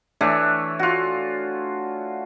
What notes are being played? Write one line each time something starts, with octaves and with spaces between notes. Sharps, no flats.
E3 A3 D4 C#5
F4 F#4